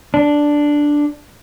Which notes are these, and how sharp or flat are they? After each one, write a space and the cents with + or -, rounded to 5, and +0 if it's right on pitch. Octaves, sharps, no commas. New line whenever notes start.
D4 +0